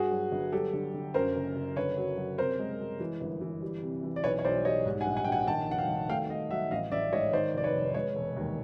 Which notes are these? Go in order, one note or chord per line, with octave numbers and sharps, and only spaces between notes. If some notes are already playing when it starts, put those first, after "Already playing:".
Already playing: G2 F#4 G#4
F#3
G1
F#3 G4 A4
D3
D3
F#2 A#4 C5
F#1
F#1
D3 B4 C#5
F#3
F#3
C3 A#4 C5
G#3
G#3
E3
G1
E3
G3
C3
E3
D5
B1 B4 C#5
C#5
B1 C5 D5
G3 C#5 D#5
G#2
F#5 G#5
A#1
F#5 G#5
A#1 G5
F#5 G#5
D#3 G5 A5
F1 F#5
F5 G5
D#3
A3 F5 G5
A3 D#5 F5
F#3 E5 F#5
A1 D#5 F5
A1 D5 E5
G#2 C#5 D#5
D#3 C5 D5
F1 D5
B4 C#5
F1
G#3 B4 C#5
E1
D#2